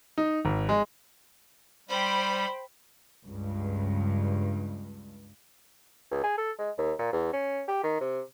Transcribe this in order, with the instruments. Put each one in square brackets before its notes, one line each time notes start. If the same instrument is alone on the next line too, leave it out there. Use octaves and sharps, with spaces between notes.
[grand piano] D#4
G#1
G#3
[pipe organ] G3 [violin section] C5 G5 B5
[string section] C#2 G2
[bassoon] C#2
G#4
A4
G#3
D#2
A#2
E2
C#4
G4
D#3
C3